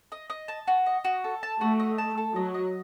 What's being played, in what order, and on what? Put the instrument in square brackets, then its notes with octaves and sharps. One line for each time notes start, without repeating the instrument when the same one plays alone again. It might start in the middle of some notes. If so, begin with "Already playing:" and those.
[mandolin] D#5
D#5
A5
F#4
D#5
F#4
A4
A5
[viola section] A3 [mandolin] F#4
[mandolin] D#5
A5
A4
[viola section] F#3 [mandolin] D#5
[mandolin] D#5